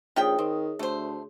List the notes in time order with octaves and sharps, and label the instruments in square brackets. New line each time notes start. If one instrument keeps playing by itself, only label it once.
[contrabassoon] A#1 [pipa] D#3 G4 G5 [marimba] G#4 C#5 D#6
[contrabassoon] D#3 [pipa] C4
[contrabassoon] D2 [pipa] A3 C5